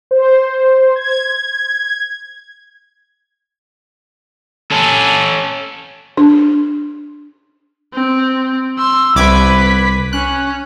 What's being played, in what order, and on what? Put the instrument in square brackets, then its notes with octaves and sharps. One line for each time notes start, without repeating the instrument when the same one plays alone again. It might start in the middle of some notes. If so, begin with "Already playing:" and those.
[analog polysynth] C5
G#6
[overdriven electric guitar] C#4 A4
[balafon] D4
[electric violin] C4
C6 E6
[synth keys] C2 D6 G#6 [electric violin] B4 B6
[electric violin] C#4 [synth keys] F#6